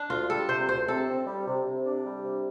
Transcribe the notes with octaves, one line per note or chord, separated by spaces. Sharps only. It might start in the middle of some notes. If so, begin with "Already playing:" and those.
Already playing: D4
D2 F4
G3 A4
C3 C5
D2 C5
C3 A4
C4
G3
C3
C3
D4
G3
C3